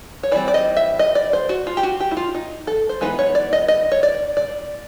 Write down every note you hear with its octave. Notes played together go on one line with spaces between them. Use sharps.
C#5
E3 G3 C4 D5
D5
D#5
E5
D#5
D5
C5
F#4
F4
G4
F#4
G4
E4
F4
D#4
A4
C5
E3 G#3 B3 D#4 B4
C#5
D5
D#5
D#5
C#5
D5
D5